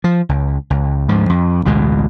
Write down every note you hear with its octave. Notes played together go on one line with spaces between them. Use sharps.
F3
C#2
C#2
D2 G#2 F3
F2
A1 D2 B2 G#3